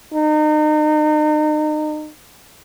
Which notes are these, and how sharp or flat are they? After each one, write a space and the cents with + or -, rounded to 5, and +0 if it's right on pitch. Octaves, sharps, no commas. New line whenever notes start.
D#4 -35